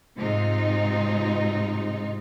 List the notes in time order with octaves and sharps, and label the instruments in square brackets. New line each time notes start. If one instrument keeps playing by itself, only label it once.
[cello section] G#2 C3 G#3 C4 D#4 F4